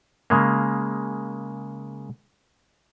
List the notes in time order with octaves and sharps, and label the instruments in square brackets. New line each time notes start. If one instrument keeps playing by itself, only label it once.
[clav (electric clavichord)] C#3 G#3 A#3